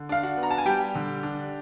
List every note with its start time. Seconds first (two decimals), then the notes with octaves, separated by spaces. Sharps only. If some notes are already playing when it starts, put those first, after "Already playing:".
Already playing: D3
0.09 D4 F5
0.23 F#4 F#5
0.37 B3
0.43 A#5
0.51 A5
0.58 G#5
0.66 G3 G4 G5
0.95 D3
1.23 D4